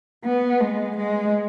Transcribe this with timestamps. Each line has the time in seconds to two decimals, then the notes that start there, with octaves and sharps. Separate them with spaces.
0.25 B3
0.61 G#3
0.97 G#3